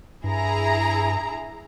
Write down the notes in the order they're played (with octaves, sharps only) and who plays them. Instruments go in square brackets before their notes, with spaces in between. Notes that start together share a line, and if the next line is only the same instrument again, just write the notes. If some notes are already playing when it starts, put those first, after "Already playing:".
[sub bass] G2 [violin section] E4 G#4 A#5